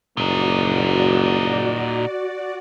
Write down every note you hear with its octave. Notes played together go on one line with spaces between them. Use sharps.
F#1 A#2 D#4 F#4 D5